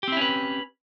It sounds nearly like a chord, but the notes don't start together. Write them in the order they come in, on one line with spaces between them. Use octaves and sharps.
G4 C4 E4 C#4 B4